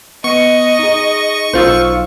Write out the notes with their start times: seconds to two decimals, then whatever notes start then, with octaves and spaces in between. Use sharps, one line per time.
0.24 B3 D#5 C#6 C#7
0.79 D#4 G#4
1.53 B1 D#4 F4 C5 E6